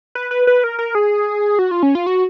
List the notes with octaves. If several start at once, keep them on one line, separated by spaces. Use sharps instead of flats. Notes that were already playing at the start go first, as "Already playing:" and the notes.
B4
B4
B4
A#4
A#4
G#4
F#4
F4
C#4
F4
F#4